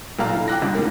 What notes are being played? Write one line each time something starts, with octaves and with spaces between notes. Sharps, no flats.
B1 A#2 F5 A#5
D3 E4
G5 D6 F#6 A#6
G1 C2
F1 C#2 G#2 A#3